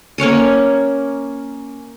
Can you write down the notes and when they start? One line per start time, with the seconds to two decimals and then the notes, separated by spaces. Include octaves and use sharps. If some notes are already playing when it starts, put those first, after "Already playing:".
0.18 A#3 C#4 C#5 G#5